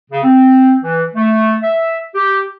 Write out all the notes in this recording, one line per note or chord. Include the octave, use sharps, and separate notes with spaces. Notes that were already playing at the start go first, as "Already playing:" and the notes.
C#3
C4
E3
A3
E5
G4